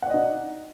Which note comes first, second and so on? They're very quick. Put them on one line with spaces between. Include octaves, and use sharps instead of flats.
F#5 D5 D#5 D#4